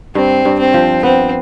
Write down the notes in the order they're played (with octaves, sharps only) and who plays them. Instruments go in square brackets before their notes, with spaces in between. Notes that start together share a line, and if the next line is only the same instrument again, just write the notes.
[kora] G2 [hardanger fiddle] C4
[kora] G2
[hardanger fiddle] C4
[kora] F3
[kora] B3 [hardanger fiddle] C4